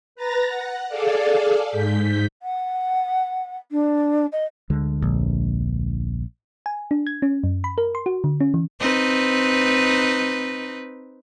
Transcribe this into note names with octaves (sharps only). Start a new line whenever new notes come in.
B4 A#5 A6 A#6
F#5
G#4 A4 D5 F5
G#2 G6 B6
F#5
D4
D#5
D2 D3 G#3
A#1
G#5
D4
G#6
C#4
F#2
B5
A#4
C6
F#4
D3
C#4
E3
C4 D#4 B4